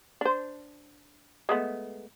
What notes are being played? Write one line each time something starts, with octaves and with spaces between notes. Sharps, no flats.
D4 C5
G#3 A3 B3